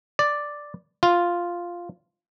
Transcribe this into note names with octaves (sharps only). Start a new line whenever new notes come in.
D5
F4